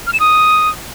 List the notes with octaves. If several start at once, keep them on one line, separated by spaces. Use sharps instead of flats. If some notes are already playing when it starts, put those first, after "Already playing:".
F6
E7
D#6